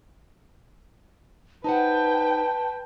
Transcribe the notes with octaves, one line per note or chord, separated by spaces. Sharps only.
D#4 B4 C5 F#5 G5 A5